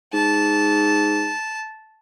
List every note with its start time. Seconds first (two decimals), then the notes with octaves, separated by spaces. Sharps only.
0.13 G#2 A5